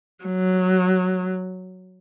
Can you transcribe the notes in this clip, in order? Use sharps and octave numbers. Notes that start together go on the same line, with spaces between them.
F#3